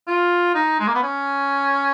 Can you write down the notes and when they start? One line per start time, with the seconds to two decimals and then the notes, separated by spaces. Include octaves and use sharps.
0.08 F4
0.55 D#4
0.79 G#3
0.87 A#3
0.95 B3
1.03 C#4